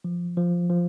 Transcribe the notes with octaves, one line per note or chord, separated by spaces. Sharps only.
F3
F3
F3